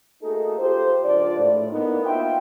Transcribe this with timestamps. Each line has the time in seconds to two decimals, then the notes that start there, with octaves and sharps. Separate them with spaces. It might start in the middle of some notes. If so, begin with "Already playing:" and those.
0.23 A3 A#3 D#4 F#4 G#4 A4
0.59 F4 G4 C5
1.04 C#2 F3 D4 F4 D5
1.39 A2
1.71 A#3 B3 D#4
2.05 F4 F#4 C5 E5 G5